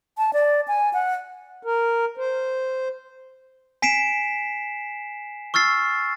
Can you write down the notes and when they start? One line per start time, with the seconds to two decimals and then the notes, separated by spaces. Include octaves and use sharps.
0.18 A5
0.33 D5
0.68 G#5
0.93 F#5
1.63 A#4
2.17 C5
3.82 G#5 B6 C7 D7 E7
5.54 C#6 E6 F6 A6 C7